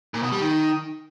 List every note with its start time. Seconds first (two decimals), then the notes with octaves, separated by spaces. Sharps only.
0.14 A#2
0.23 B2
0.32 G3
0.41 D#3